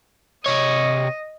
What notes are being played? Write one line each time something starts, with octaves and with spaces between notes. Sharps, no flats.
C3 C#5 D#5